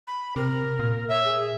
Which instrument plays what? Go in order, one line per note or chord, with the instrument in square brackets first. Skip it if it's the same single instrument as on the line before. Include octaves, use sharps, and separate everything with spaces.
[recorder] B5
[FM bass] C3 [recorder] A#4
[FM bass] A#2
[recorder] C#5 [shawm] E5
[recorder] G#4